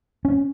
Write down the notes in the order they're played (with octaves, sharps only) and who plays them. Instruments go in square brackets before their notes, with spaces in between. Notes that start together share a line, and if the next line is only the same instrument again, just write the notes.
[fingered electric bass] C#4